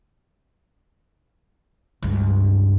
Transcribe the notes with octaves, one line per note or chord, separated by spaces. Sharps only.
C#2 G2